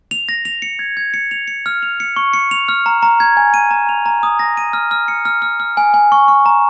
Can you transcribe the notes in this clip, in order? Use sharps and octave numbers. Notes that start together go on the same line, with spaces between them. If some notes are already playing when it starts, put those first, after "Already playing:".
F7
A#6
F7
C#7
G#6
G#6
C#7
F7
C#7
F6
F7
C#7
C#6
C#7
F7
F6
A#5
A#5
G#6
G#5
D#7
A#5
F7
A#5
D#6
A#6
D#7
F6
F6
C#7
F6
F6
F6
G#5
G#5
C#6
C#6
A#5